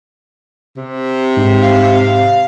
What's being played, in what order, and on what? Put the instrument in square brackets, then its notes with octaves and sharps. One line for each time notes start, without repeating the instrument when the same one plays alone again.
[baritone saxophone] C3
[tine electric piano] G#2
[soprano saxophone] F5